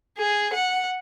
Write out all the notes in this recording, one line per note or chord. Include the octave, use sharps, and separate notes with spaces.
G#4
F#5